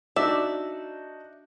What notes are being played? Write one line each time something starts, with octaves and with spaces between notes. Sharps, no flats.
D4 D#4 F#4 D5 E5